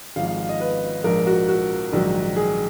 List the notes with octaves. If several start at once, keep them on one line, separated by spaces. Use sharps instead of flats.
G#1 G#2 F3 F5
F5
F5
D#5
B4
A#1 G#2 F3 A#4
F#4
F#4
A#1 G#2 D#3 F#3
G#4